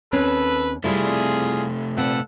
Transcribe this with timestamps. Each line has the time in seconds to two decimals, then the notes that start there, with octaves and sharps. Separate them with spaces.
0.13 D#2 C4 C#4 A4 B4
0.84 C3 G3 A3 C4 E4 F4 G#4
1.97 A#2 C4 A4 B4 F#5